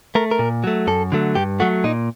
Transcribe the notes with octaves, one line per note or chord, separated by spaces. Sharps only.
A3 A#4
A#4
A#2
F#3 A3
F#2 A4
D3 F#3 A3
G2 G4
F#3 A3 F#4
A#2 D#4